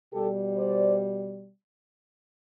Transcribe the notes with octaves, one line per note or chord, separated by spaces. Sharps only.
B2 G3 G4 A4
C5 D5